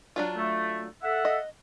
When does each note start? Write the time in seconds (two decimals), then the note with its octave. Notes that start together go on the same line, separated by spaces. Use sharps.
0.16 F#3 D4 F4
0.37 A3
1.03 A4 E5 F#5
1.25 D#5